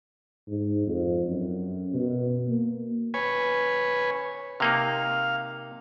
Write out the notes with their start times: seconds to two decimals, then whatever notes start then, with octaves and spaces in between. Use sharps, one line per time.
0.48 G#2
0.87 F2
1.26 F#2
1.94 B2
2.48 A#3
3.14 B4 C#5 G#5
4.60 C3 A#3 D#4 F5